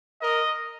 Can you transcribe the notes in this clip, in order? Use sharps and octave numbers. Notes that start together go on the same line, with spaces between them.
A#4 D#5